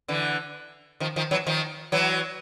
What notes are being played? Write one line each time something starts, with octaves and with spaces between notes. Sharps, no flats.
D3 E3
D#3 F3
D#3 F3
E3 F#3
D#3 F3
E3 F#3